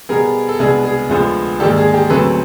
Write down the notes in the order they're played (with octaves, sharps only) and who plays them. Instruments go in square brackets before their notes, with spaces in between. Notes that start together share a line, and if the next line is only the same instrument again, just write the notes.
[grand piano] B2 G3 B3 G#4 A#4
A4
C2 B2 G#3 B3 D4 G#4
G#4
D2 D3 F3 G#3 B3
G#2 D#3 G3 A#3 D4 G4 A4
G#4
G4
D2 C#3 F#3 A3 C4 A4 B4